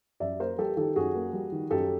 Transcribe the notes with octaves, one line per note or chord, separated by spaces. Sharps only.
F#2 D5 E5
A#3 A#4 C5
G3 G4 A4
D#3 G4 A4
F#2 F#4 G#4
A#3
G3
D#3
F#2 G4 A4